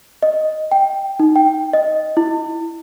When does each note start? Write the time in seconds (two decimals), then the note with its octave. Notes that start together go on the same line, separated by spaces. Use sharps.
0.23 D#5
0.71 G5
1.19 D#4
1.36 G5
1.73 D#5
2.17 E4